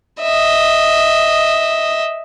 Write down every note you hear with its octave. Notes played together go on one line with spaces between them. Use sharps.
D#5 E5